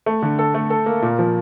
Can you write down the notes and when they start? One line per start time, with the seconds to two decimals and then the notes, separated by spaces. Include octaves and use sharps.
0.06 A3
0.22 D3
0.39 A4
0.54 A3
0.70 A4
0.86 A#3
1.02 A#2
1.19 F3